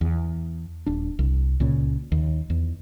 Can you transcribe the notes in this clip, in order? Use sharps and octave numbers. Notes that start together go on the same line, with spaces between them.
E2
D#1 D4
C2
C#2 A#2 C#3
D#2
E2